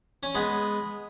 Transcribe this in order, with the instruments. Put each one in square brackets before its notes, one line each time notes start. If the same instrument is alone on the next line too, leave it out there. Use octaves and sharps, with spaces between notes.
[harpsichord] C#4
G#3 B3